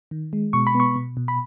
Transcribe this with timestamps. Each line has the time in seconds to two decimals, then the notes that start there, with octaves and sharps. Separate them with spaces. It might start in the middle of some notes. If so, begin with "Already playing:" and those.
0.11 D#3
0.33 G#3
0.53 B2 C#6
0.67 B5
0.75 B3
0.80 C#6
0.96 B2
1.17 B2
1.28 B5